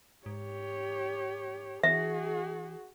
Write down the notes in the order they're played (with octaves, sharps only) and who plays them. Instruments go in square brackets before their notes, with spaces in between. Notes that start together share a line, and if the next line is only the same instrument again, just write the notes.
[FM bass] G#2 [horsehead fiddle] G4 C#5
[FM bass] E3 [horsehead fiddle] F#4 G#4 [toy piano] E5